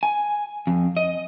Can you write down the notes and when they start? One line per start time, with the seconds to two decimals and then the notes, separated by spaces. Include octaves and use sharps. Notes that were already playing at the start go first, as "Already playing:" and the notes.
0.03 G#5
0.67 F2
0.97 D#5